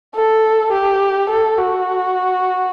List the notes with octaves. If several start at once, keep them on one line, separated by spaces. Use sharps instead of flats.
A4
G4
A4
F#4